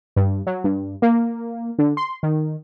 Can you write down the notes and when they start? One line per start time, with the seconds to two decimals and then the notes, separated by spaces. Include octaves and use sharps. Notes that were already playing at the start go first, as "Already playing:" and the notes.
0.16 G2
0.47 F#3
0.64 G2
1.02 A#3
1.79 D3
1.97 C6
2.23 D#3